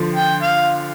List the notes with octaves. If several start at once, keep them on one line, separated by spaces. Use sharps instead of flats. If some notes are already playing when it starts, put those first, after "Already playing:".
Already playing: D3 F3
G5
F5